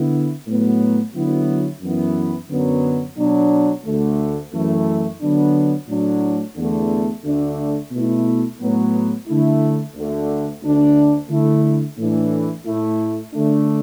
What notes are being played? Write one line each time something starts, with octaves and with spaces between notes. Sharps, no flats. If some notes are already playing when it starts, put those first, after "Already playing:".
Already playing: D3 B3 E4
A2 F#3 B3
D3 F#3 B3 E4
F#2 E3 B3 E4
F#2 D3 F#3 B3
B2 F#3 D4
D2 D3 A3
F#2 E3 A3 E4
D3 F#3 B3 D4
A2 F#3 D4
E2 D3 A3
D2 D3 A3 D4
B2 A3 E4
A2 F#3 B3
D3 A3 E4
D2 D3 A3
D2 D3 A3 D4
D3 A3 E4
A2 E3 D4
A2 A3 E4
D3 A3 D4